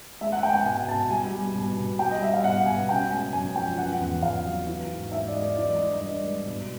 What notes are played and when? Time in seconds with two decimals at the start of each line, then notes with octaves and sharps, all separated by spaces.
0.21 G#3 E5
0.32 F#5
0.43 G#3 G5
0.54 G5
0.65 B2 G#5
0.88 B2 A5
1.10 G3 G#5
1.33 G3
1.55 B2
1.77 B2
1.99 G3 G5
2.11 D#5
2.22 G3 E5
2.33 F5
2.44 B2 F#5
2.66 B2 G#5
2.89 C#3 G5
3.11 G#3 G#5
3.33 F#2 G#5
3.56 F3 G5
3.78 C#3 F#5
4.00 E2
4.22 E2 F5
4.45 F#3
4.67 E3
4.89 G#2
5.12 G#2 E5
5.28 D5
5.34 G#3 D#5
5.56 E3 D5
5.78 G2 D#5
5.93 D#5
6.01 G2 D5
6.23 G#3
6.46 B2